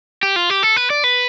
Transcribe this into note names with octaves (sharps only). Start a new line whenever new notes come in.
G4
F4
G4
A4
B4
D5
B4